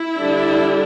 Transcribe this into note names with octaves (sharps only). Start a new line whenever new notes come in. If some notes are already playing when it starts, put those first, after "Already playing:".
Already playing: E4
D3 G3 D4